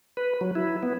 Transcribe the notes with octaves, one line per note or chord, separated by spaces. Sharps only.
B4
F#3
E4
B3